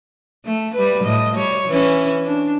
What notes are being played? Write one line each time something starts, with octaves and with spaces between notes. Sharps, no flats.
A3
G3 B4
A2 D#5
G3 C#5
E3 C#4
D4